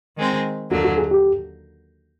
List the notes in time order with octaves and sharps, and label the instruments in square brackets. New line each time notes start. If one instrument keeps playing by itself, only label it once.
[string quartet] D#3 G#3 C4
[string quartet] D#2 D3 F#3 A#3 [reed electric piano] F#4
[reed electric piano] F#4
G#4
G4